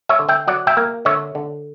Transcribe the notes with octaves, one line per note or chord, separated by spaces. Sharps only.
C#5 E5
D3
E5 G5
F#3 D5 F#5
E5 G5
A#3
D3 C#5 E5
D3